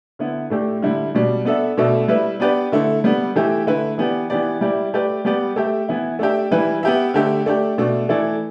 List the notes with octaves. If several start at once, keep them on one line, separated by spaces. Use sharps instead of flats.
D3 B3 E4
A2 A3 D4 G4
D3 G3 E4
B2 G3 D4
B3 D4 A4 E5
B2 A3 D4 A4 E5
G3 E4 B4 E5
B3 D4 G4 B4 D5
D3 A3 E4 A4
G3 B3 D4
E3 A3 G4 E5
D3 A3 E4 B4
E3 B3 G4 D5
E3 B3 G4 D5
G3 E4 G4 D5
A3 G4 B4 D5
G3 B3 G4 D5
A3 G4 E5
E3 B3 E4
A3 D4 G4 E5
E3 G3 E4 B4
B3 G4 E5
D3 A3 G4 E5
A3 D4 G4
B2 A3 D4
E3 A3 E4 A4 D5